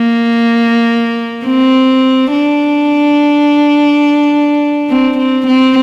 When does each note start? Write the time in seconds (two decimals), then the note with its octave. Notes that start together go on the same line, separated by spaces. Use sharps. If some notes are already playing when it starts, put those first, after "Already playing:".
Already playing: A#3
1.46 C4
2.32 D4
4.90 C4
5.18 C4
5.47 C4